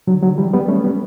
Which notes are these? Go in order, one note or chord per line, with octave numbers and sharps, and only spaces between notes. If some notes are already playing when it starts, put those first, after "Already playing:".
D3 F#3
D3 F#3
E3 G3
G3 B3
A3 C#4
G3 B3